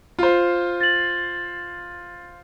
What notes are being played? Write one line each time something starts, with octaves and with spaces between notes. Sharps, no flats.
F4 C5
A6 F#7